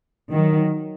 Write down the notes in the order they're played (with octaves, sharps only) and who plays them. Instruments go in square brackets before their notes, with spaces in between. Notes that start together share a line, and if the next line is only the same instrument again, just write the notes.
[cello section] D#3 F#3